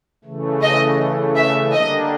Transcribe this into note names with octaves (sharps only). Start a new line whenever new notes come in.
C#3 E3 A3
D#5
E5
D3 G3 A#3 D4 D#5